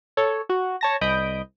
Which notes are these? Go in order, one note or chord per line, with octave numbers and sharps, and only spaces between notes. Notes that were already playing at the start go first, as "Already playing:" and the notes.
A4 C#5
F#4
C#5 A5 A#6
C2 D#5 B5 D#6 G6 D7